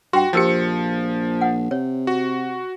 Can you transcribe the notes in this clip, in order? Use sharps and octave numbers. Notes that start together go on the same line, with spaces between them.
G2 F#4 G5 C6
A#1 F3 G4 A#4 C5 C#7
F#5
C3 C#5
F#4